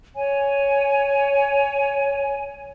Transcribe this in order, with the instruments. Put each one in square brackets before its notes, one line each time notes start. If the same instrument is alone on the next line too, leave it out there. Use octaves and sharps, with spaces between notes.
[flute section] C#5 G#5